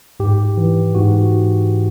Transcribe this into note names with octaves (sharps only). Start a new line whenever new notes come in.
G#2 G4
E3
G#2 F#4